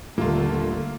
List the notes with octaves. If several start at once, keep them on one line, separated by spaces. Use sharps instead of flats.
D#1 D3 A3 A#3 F4